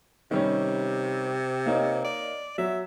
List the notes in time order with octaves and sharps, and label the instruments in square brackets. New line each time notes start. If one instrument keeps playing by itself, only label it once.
[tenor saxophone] C3 [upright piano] D#3 G3 C#4
[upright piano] A#3 D#4 C#5
[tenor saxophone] D5
[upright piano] F#3 [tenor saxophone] E5